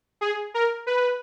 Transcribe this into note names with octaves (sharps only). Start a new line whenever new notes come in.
G#4
A#4
B4